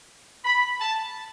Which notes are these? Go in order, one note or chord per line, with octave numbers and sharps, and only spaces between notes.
B5
A5